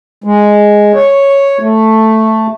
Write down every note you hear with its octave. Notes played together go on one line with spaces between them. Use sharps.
G#3
C#5
A3